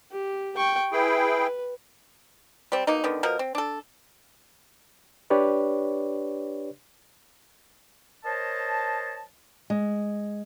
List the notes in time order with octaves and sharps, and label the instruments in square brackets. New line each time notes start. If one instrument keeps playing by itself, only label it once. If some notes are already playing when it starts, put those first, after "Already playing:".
[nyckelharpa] G4
G5 C#6
[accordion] E4 G#4 G5 [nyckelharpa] B4
[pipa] G3 C4
B2 A#3 D#4
D3 D#3 B3
B2 F3 A#4
C4
D4 A4
[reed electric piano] D4 G4 B4 C#5 D5
[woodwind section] A#4 C5 C#5 D#5 A5
[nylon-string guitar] G#3